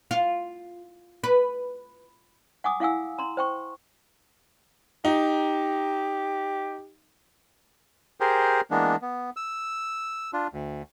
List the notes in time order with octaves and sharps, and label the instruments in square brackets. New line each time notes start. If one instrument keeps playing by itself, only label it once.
[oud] F4
B4
[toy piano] F#5 G#5 D6 D#6
E4 F5 F#5 G#5 E6
A#5 C6
C5 G5 C#6
[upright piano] D#4 [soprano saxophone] G4
[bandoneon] G4 G#4 A#4 C5
E3 G#3 A#3 B3 D4
B3
E6
D4 F4
D2